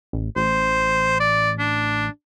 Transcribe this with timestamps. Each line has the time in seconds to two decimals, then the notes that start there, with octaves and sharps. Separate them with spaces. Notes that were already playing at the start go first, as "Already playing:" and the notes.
0.13 A1
0.36 A1 C5
1.20 D5
1.59 D4